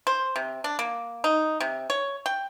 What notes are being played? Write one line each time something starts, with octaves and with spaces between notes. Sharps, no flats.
C5
C3
D4
A#3
D#4
C3
C#5
G5